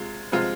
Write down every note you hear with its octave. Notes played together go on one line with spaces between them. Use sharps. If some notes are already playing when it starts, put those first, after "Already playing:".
Already playing: C3 G#3 F4
C3 F3 G#3 F4